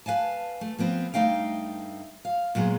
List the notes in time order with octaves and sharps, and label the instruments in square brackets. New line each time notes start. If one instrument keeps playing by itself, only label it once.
[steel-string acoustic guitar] B4 F5 G#5 A5
A3
F3 B3 C4 B4
G2 A3 D#4 F5 G5
F5
A#2 F#3 G#3 B3 A#5